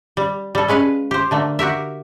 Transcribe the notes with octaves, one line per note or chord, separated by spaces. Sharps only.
G3
G3 A4
G#3 C#4 B4 F5
G4 C5
D3 A3 A#3
F#4 G4 A#4 E5